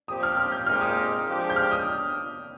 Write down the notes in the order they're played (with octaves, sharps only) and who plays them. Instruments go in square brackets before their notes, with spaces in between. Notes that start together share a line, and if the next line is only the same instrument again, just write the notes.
[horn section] A#2 F3 C4 G4 [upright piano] D#6
[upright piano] F6
F6
G6
[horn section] A#2 G#3 C4 D#4 G4 [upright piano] F6
[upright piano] D#6
[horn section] F3 G#3 D4 G4
[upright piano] G6
F6
D#6